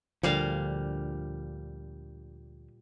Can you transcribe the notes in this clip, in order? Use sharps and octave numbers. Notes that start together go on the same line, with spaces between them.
D2 A#2 D3 F3 G3 F5